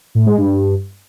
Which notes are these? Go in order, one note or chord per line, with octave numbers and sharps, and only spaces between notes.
A2
G#3
G2